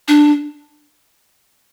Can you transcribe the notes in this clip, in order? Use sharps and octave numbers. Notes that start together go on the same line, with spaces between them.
D4